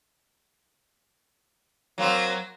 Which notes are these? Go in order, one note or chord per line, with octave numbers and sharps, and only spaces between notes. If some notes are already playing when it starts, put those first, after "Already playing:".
F#3 A#3 C4